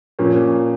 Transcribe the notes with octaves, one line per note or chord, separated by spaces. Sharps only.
A#2 F3 A#3 C#4